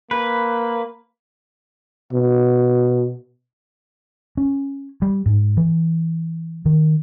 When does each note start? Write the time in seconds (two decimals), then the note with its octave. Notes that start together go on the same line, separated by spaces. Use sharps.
0.11 A#3 B4
2.13 B2
4.37 C#4
5.02 G3
5.26 G#2
5.57 E3
6.66 D#3